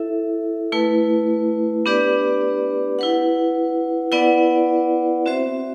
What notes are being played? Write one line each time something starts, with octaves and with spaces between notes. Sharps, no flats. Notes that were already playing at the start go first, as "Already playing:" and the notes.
Already playing: E4 A4 E5
A3 E4 B4
B3 D4 G4 B4 D5
E4 B4 F#5
B3 E4 B4 D5 F#5
C4 F#4 C5 E5